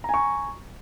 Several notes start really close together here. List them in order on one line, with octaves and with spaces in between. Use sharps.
A#5 G#5 C#6